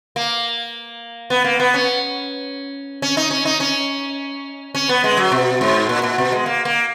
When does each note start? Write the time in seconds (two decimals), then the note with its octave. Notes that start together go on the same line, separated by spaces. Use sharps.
0.16 A#3
1.30 B3
1.44 A#3
1.60 B3
1.74 C#4
3.02 C#4
3.17 D#4
3.31 C#4
3.45 D#4
3.60 C#4
4.75 C#4
4.89 B3
5.04 G#3
5.17 F#3
5.32 B2
5.61 G#2
5.89 A#2
6.03 A#2
6.18 B2
6.32 G#3
6.46 A#3
6.65 A#3